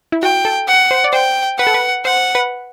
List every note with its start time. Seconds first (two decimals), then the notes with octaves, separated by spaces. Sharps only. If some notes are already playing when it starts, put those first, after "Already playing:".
0.12 E4
0.22 F#4 G5
0.45 A4
0.68 F#5
0.91 C5
1.04 D5
1.13 C5 G5
1.58 B4 F#5
1.67 A4
1.74 B4
2.05 C5 F#5
2.35 B4